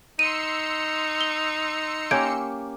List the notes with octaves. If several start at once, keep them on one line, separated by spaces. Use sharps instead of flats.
D#4 C6 E6 C#7 D#7
G7
A#3 C#4 G4 G6 G#6 D7